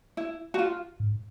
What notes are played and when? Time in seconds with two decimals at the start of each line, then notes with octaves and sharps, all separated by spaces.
0.17 E4
0.54 F#4
0.59 F4
1.00 G#2